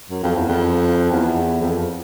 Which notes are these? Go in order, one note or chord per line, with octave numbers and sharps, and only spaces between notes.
F#2
F2
E2
F2
E2
F2